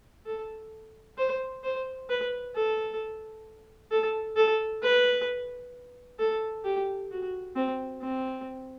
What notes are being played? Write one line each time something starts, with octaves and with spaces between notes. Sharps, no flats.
A4
C5
C5
B4
A4
A4
A4
B4
A4
G4
F#4
C4
C4